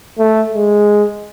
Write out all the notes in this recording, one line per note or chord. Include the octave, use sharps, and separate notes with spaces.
A3
G#3